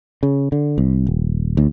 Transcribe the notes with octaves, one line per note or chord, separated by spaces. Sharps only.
C#3
D3
C2
D#1
D2